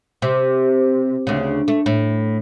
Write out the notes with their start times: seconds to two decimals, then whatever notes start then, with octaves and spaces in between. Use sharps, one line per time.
0.22 C3
1.27 D2 C#3
1.68 A3
1.86 A2